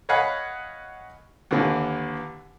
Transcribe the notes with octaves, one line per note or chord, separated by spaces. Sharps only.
C#5 D#5 F5 F#5 G#5 B5
D#2 D3 E3